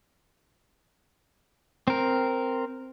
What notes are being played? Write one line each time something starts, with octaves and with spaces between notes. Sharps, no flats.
C4 A#4